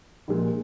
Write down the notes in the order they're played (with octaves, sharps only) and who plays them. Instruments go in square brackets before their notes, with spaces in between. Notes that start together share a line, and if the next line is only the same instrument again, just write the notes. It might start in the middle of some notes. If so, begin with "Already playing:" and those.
[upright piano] A#1 A#2 G#3